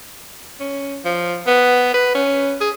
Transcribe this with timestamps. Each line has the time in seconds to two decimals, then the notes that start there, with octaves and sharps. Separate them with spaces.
0.60 C#4
1.05 F3
1.47 B3
1.94 B4
2.15 C#4
2.61 G#4